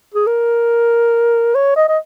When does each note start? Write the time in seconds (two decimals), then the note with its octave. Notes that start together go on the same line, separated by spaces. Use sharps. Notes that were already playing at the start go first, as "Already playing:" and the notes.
0.15 G#4
0.27 A#4
1.55 C#5
1.76 D#5
1.89 D#5